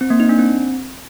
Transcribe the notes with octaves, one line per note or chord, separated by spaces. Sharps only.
C4
A#3
D#4
D4
C4